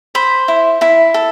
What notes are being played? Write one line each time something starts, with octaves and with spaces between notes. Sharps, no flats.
C5 B5
E4
E4 B5
A4